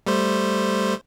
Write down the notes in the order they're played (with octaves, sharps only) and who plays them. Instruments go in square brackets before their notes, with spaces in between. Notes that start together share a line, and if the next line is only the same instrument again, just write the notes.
[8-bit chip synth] G3 A3 C5